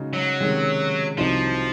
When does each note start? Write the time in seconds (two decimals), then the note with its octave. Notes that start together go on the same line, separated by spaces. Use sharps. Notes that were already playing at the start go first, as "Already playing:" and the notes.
Already playing: C#3 G#3 D#4 F#4
0.13 F#3
0.40 C3 D#3 G#3 C#4
1.17 C2 C3 F3 F#3 C4 D#4